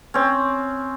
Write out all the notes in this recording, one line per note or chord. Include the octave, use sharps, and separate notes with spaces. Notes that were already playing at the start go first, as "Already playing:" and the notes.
C4 C#4